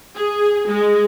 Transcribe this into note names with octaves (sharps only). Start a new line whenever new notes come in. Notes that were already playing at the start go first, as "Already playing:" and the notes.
G#4
G#3